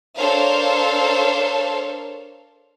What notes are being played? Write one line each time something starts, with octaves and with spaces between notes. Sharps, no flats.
D4 A4 A#4 C5 C#5 F5